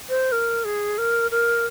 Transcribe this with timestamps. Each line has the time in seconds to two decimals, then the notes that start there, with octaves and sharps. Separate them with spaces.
0.09 C5
0.32 A#4
0.65 G#4
0.98 A#4
1.31 A#4